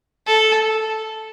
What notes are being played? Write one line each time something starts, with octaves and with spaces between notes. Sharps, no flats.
A4